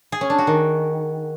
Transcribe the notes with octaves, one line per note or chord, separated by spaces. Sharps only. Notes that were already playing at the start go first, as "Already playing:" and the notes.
G#4
C#4
D4
F#4
D#3